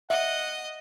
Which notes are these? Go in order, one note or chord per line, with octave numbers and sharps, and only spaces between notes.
D#5 E5 F#5